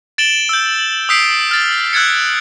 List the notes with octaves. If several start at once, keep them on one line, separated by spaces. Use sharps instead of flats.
A6 D7 E7 F#7 G7
E6 G6
D#6 E6 G6 B6 C7 D7
F6 A6
E6 F#6 G#6 A6 C#7